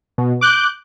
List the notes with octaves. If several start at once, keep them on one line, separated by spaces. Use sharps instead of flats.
B2
D6 F#6 G6 D7